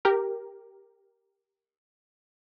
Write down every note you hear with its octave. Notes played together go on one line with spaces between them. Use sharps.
G4 A#4